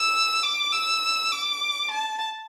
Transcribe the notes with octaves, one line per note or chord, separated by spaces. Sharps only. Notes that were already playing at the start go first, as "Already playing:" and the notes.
Already playing: E6
D6
E6
D6
A5